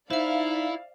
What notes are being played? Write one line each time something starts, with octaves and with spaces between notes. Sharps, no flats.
D#4 E4 C5 D5 E5 F5